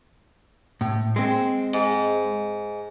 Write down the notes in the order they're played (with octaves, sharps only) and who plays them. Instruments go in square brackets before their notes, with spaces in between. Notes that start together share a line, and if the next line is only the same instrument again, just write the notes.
[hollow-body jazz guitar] A2
G#3 C4
[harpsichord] G#2